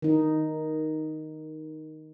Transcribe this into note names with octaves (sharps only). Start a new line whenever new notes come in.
D#3 D#4